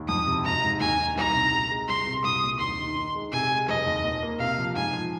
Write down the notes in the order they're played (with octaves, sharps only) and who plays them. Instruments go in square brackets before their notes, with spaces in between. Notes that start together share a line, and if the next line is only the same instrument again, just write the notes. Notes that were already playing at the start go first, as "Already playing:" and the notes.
Already playing: [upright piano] D#2
[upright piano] F2 [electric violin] D#6
[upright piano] C3
[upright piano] G#1 [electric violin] A#5
[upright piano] G#2
[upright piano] D#2 [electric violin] G#5
[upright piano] D#3
[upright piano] C2 [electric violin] A#5
[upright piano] C3
C3
G#3
[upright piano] C2 [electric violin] C6
[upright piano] C3
[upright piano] C2 [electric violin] D#6
[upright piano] A#2
[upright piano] D#2 [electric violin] C6
[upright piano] D#3
D#3
G#3
[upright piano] C3 [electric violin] G#5
[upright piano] G#3
[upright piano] F1 [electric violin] D#5
[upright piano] D#2
A#2
A#3
[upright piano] C3 [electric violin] F5
[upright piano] F3
[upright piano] G#2 [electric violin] G#5
[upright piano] F3